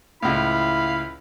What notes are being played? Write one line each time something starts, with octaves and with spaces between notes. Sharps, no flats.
C#2 A2 E4 F5 B5